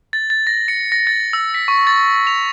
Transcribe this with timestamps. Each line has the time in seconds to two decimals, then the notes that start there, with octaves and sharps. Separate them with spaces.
0.13 A6
0.30 A6
0.47 A#6
0.68 C#7
0.92 A#6
1.07 A6
1.33 E6
1.54 B6
1.68 C#6
1.87 A6
2.27 F7